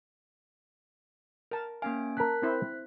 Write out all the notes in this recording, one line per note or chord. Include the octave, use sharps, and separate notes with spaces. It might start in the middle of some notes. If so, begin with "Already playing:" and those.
A#4 A5
A#3 C#4 F5 G#5
A#4 A5 F#6 B6
C4 E4 C5